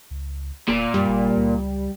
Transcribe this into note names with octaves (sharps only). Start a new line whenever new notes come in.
C#2
E1 A#2
F#2 G3
G1
C#2